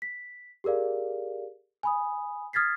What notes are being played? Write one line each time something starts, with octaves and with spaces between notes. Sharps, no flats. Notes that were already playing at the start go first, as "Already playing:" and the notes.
B6
G4 G#4 A#4 D5 F5
G#5 B5 D#6
D#6 F6 G#6 A6 B6 C7